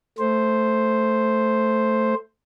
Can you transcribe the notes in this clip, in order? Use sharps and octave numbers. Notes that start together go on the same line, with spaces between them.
A3 C5